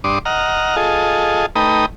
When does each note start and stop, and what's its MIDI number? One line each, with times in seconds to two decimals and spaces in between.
0.04 0.19 43
0.04 0.19 62
0.04 0.19 84
0.04 0.19 86
0.04 0.19 87
0.25 0.76 75
0.25 0.76 78
0.25 0.76 82
0.25 0.76 89
0.76 1.46 65
0.76 1.46 68
0.76 1.46 69
0.76 1.46 75
1.55 1.86 57
1.55 1.86 63
1.55 1.86 71
1.55 1.86 79
1.55 1.86 82
1.55 1.86 87